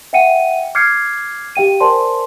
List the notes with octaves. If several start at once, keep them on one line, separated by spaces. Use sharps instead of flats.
E5 F#5 G5 C#7 D#7
D6 F6 G6 G#6 C7 C#7
G4 F5 G5 D#7
A#4 C5 D5 G#5 A5 C6